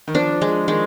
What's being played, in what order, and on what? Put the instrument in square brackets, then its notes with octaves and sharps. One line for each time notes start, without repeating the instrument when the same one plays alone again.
[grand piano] D#3
[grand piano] F3 [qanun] D4
[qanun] G#3
[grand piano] D#3 [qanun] G#3